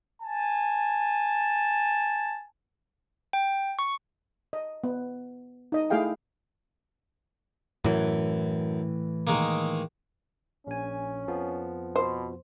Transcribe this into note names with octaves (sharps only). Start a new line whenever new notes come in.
G#5 A5
G5
C#6
D#5
B3
D#4 D#5
A3 E4 G#4 F5 G5
F#2 A2 E3
D#3 G#3 A#3
A#1 C#4 G#5
F2 F3 B3
B2 C5